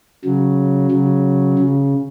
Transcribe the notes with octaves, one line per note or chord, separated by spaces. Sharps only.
C#3 F#3
C#3 F#3
C#3